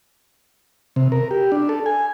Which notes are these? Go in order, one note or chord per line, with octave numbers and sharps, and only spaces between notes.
C3
A#4
G4
D4
A4
G#5